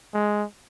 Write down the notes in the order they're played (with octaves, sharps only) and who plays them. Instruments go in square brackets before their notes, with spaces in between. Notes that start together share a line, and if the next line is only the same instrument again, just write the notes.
[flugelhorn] G#3